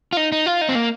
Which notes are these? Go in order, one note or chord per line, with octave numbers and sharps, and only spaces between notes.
F4
D#4
D#4
F4
D#4
C4
A#3